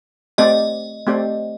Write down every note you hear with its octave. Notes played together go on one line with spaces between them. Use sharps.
A3 C4 G4 D5 D#5
A3 C4 G4 D5